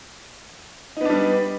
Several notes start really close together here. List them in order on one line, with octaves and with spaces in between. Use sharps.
D#4 B3 D4 G3